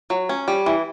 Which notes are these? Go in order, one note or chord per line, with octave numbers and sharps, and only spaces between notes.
F#3
C#4
G3
E3